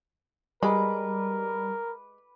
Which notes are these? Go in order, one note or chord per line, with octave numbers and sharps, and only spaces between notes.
G3 G#3 A#4 B4 D6